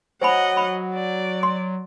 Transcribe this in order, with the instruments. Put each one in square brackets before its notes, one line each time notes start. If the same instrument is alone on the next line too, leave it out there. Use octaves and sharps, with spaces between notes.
[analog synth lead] F#3 [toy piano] C5 G#5 B5 [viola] D#5 F#5
[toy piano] B5
[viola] D5
[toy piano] C6